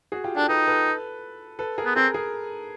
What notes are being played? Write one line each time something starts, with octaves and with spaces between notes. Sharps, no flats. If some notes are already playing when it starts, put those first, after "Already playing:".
F#4 G#4
F4 G4
D4 G4 A4
D#4 A4 B4
A4 B4
A4 B4
G#4 A#4
B3
C4 G#4 A#4
G#4 A#4